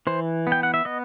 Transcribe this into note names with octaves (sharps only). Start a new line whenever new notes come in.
E3 C5
B3
G5
F#5
E5
B3 D#5